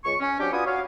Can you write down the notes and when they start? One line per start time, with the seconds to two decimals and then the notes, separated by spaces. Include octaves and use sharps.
0.05 C#2 C#6
0.20 C#4
0.40 F#3 C4 D4 G4
0.53 F4 F#4 B4 D5 G#5 D#6
0.67 F#4 C#5 F5